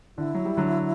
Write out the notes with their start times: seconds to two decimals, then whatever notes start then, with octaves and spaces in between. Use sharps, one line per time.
0.17 D3 E4
0.35 F#3
0.45 G3
0.57 D3 F#3